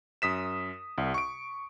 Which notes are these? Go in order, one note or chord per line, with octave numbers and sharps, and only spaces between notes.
F#2 D#6 B6 E7
C2
C#6 D7